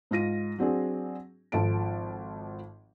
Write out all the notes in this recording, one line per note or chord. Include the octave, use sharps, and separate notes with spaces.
G#2 F4 A#6 D#7
F#3 C4 D4 G#4
G#1 F3 A4 A5 D7